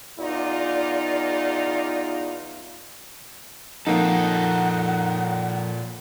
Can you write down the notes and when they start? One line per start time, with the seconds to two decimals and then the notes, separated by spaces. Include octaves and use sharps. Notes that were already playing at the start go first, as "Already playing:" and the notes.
0.20 E2 D#4 F4 D5
3.87 F2 A#2 A#3 D#4 A4 F#5